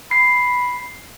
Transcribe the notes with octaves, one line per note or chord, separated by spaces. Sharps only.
B5 C7